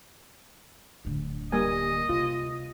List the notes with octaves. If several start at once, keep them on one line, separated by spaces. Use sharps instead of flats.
D1 D3
G3 A#3 D#5 G#5
C3 F4